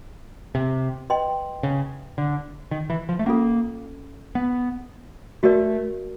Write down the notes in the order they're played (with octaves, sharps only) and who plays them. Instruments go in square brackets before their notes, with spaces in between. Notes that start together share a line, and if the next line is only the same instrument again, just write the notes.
[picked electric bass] C3
[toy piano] B4 D#5 G5 C6
[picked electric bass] C#3
D3
D#3
E3
F3
A3
[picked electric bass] A#3 [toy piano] C#4 F4 A4
[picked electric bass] B3
[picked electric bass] A3 [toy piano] F#4 A#4 D5